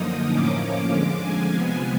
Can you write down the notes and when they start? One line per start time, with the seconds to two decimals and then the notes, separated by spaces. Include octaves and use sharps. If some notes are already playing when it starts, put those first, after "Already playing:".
Already playing: F#2 D3 F3 A#3 D#4 D#6
0.30 A2 F3 A#3 C#4 D6
0.60 D6
0.89 F2 D3 F3 G#3 D6
1.19 G#5
1.49 C3 F3 G#3 B3